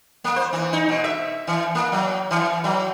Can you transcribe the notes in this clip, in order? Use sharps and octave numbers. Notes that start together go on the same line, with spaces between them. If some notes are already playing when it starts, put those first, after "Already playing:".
A#3
C5
E3
D#4
B2
E5
E3
A#3
F#3
E3
F#3